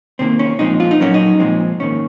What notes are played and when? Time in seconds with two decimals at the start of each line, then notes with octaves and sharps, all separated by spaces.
0.19 C3 D#3 F#3 A#3 C4
0.39 C#4
0.59 A#2 F3 G#3 C4 D#4
0.80 F4
0.91 D#4
1.00 A#2 F#3 A#3 C#4
1.14 D#4
1.39 A#2 F3 G#3 C4
1.80 G#2 D#3 A#3 C#4